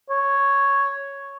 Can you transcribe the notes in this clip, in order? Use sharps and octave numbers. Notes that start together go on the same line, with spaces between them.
C#5